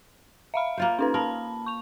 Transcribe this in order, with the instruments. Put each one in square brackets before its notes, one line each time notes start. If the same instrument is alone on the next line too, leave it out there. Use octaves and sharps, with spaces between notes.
[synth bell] E5 F5 B5
[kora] A#3 F4 C5
[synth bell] C#4 D#4 B4
[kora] A#4 [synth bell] A5 B5
[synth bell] C#6 F7